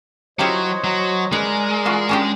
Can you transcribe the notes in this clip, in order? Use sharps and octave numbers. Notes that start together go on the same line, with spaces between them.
F#3 E4 F4 G4 C5 C#5 D#5
F#3
G#3 D#4 G#4 A#4 B4 D5
E3 F4 F#4
C#4 D4 G4